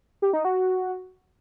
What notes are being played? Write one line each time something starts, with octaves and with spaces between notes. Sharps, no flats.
G4
D#4
F#4